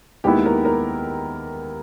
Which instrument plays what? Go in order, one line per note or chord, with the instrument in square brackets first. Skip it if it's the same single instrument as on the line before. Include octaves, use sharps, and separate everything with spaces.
[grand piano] D#2 D#3 G#3 B3 E4 [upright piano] G4
[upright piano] A#4
A#4